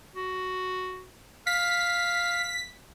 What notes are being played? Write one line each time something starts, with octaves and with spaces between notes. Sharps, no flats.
F#4
F5 B6